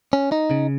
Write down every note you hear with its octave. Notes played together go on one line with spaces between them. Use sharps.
C#4
D#4
C#3